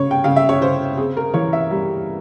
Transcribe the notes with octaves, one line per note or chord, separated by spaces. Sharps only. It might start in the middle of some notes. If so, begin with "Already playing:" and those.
Already playing: C#3 C#5
G5
C#3 F5
E5
C#5
C#3 C5
C4 G#4
A#4
E3 C#5
E5
G3